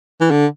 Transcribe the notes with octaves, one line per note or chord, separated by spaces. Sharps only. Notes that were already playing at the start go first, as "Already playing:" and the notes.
E3
D3